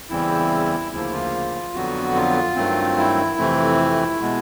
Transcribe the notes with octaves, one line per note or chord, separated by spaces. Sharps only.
E2 C#3 E3 G3 C4 E4
D2 C#3 F3 A#3 E4
F4
F2 D3 F#3 B3 F#4
F4
G2 D#3 F#3 A3 C4
E4
F2 C3 E3 A3 C4
B2 G#3 B3